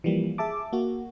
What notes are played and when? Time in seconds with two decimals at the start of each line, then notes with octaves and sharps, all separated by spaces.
0.04 E3 F3 G3 A#3
0.38 G#4 E5 A5 D6
0.73 A#3 F#4